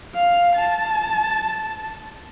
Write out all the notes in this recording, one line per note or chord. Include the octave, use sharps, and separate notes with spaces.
F5
A5